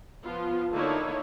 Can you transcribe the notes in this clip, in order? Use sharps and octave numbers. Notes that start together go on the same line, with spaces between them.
F3 B3 F4
D3 A#3 D#4 E4 A4 C#5